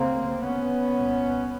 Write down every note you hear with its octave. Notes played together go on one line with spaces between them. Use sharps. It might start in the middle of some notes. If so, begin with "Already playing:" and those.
Already playing: D2 C#3 A#3 C4
B3 C#4
C2 A#2